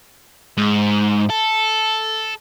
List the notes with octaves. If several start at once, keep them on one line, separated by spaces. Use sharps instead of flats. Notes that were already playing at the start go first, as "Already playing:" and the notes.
G#2
A4